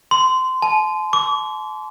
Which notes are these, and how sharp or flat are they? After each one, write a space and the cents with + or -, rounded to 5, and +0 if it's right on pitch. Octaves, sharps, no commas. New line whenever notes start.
C6 -20
A5 -40
D6 -35